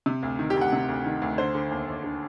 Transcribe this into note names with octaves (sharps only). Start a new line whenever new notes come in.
C3
D2
D#3
G4
D2
F#5
C3
D2
D#3
D2
D3 C5
D3
D#2
D#2
D3